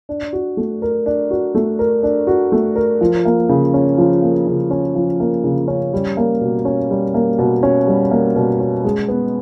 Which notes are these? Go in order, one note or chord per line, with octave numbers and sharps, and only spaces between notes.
D4
F#4
A3
A#4
D4
F#4
A3
A#4
D4
F#4
A3
A#4
F3
A#3
C#3
C#4
F3
A#3
C#3
C#4
F3
A#3
C#3
C#4
G3
A#3
B2
C#4
G3
A#3
B2
C#4
G3
A#3
B2
C#4
G#3
B3